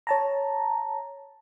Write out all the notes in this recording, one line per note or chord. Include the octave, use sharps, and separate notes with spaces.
C#5 A5 A#5